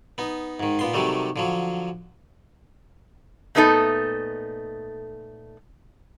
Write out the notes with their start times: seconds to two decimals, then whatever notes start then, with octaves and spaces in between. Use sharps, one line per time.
0.18 B3 D#4
0.60 G#2 D#3
0.79 A#2 B3 C6
0.94 C3 D#3 F#3 G3 A3
1.36 D3 F3 F#3
3.55 A#2 A3 B3 D#4 A4